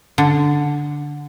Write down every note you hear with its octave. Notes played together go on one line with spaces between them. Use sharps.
D3